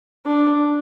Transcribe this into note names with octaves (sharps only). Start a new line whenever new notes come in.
D4